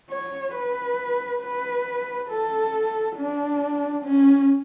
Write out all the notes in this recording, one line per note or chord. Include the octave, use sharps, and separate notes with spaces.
C#5
B4
B4
A4
D4
C#4